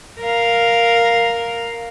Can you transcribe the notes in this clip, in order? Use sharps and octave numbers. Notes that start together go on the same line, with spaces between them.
A#4 F5